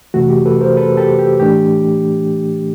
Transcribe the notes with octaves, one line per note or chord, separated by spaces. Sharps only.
F2 C3 E3 A3 F#4
G4
A4 B4
A#4 C5
A4 B4
G4 A4
G4
A2 E3 A3 D4 G4